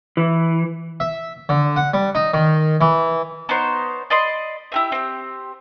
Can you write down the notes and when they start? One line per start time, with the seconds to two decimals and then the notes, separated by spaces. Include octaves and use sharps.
0.17 E3
1.00 E5
1.49 D3
1.76 F#5
1.94 G3
2.15 D#4
2.34 D#3
2.81 E3
3.49 B3 D#4 C5 C#5
4.10 D5 D#5 B5 C6
4.72 E4 G4 E5
4.92 C4 G4